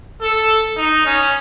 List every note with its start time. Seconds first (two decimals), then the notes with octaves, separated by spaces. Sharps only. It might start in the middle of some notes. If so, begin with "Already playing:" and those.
0.22 A4
0.78 D#4
1.06 C#4